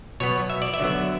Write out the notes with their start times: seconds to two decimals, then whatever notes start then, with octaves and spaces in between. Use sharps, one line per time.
0.20 B2 F#3 B3 C#5
0.50 E5
0.62 D5
0.74 E5
0.80 D3 F#3 B3